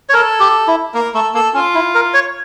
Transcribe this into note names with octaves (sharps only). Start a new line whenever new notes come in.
C#5
A4 A#4
G4
E4
A#3 A#4
A3 A4
A#3 A4
C#4 F4
E4
A#4
C#5